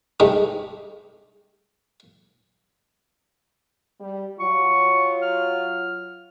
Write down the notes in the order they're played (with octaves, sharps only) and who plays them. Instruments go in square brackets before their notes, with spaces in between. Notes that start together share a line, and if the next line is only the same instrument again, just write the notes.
[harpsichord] G2 C3 G#3 A3 D#4
[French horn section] G3
[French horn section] F#3 F4 [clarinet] C#6
[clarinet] F6